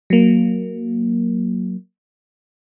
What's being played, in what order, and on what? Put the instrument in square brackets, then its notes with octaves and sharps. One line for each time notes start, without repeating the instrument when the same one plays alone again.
[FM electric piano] F#3 A#3